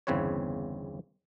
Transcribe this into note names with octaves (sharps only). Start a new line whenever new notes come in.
G1 E2 C#3 C4 B4 C#5